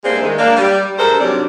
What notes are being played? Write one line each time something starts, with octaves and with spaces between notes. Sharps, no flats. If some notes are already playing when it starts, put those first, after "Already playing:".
G2 G#3 A#3 E4 C5 D5
D#3 G#3
A#3 D4 F5
G3
G2 G#3 A4 A#4 C5
G#2 C3 F#3 G3 D4